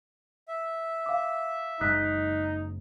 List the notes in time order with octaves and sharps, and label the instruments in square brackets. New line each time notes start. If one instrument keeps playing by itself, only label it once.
[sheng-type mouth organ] E5
[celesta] F5 D6
[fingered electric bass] F#1 G#3 [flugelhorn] D#4 [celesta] D#6 F#6 B6